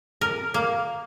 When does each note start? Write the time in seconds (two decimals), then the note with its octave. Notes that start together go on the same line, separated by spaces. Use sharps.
0.21 A#4
0.54 A#3